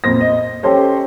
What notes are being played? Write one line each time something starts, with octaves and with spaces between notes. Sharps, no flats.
F2 A#2 C5 A#6
D#5
C#4 G4 A4 C5 C#5